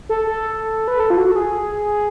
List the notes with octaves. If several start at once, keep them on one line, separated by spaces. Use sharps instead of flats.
A4
A4
B4
A4
F4
F#4
A4
G#4